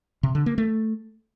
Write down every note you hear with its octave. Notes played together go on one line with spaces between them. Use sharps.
C3
D3
A#3
A3